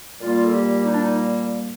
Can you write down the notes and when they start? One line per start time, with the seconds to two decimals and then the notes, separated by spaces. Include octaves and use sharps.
0.21 A#2 G3 A#3 F4
0.42 A4
0.53 G4
0.85 D#4
0.94 D4
1.02 D#4